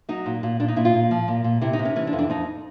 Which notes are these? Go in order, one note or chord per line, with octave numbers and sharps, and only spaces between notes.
F#3 D#4
A#2
A#2
A#2 D4
D#4
A#2 E4
F4
A#2
F3
A#2
A#2
C3 E4
D#4
C3
C#4
E3 C#4
D4
F2
D4
F2 D#4